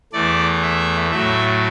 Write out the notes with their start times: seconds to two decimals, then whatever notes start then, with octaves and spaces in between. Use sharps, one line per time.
0.13 E2 E3 A3 D5
0.62 E5
1.11 A2 F#3 A3 E5